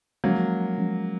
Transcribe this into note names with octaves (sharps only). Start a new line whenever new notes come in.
F3 F#3 G#3 A#3 C#4
F3 G#3 C#4